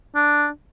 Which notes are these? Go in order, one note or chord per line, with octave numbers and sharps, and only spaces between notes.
D4